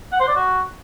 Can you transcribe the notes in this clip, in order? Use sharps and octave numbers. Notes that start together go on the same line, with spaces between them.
F#5
C5
D5
F#4